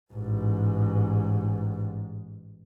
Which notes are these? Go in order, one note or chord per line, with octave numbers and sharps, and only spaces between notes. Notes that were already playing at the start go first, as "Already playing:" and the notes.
A1 G#2